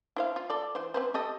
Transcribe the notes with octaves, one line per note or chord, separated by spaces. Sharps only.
E4 C5 F5
F4
A4 D5
E3 C5
C4 B4 C5
G4 A4 D#5